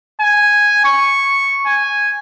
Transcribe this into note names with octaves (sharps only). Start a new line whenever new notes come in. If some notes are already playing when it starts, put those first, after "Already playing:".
G#5
C#6
G#5